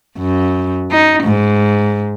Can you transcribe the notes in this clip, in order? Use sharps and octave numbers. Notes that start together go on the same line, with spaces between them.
F#2
D#4
G#2